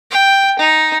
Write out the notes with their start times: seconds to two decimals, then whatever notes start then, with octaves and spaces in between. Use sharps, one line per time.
0.11 G5
0.60 D#4